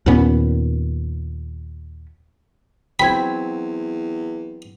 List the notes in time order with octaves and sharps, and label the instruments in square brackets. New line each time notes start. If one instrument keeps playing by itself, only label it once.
[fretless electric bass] D#2 A#2 B3 C#4
[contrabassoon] E2 [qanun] F#3 C4 [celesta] G5 G#6 [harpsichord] B5